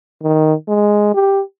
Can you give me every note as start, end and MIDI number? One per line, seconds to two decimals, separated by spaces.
0.23 0.53 51
0.68 1.12 56
1.14 1.42 67